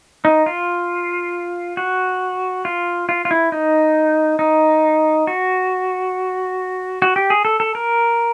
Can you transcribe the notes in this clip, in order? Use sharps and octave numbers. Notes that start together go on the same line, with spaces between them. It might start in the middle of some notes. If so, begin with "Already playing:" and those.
D#4
F4
F#4
F4
F4
F4
E4
D#4
D#4
F#4
F#4
G4
G#4
A4
A4
A#4